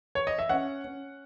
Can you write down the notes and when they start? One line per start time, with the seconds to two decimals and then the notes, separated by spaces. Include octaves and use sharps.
0.15 C#5
0.27 D#5
0.39 E5
0.49 C#4 F#5
0.84 C#4